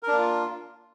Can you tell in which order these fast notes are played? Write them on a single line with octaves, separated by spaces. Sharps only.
A#4 D4 A#3 F4